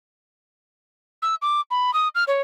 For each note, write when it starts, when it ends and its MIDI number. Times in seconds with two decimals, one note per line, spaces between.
1.22 1.35 88
1.42 1.61 86
1.71 1.93 83
1.94 2.08 87
2.15 2.24 89
2.28 2.42 73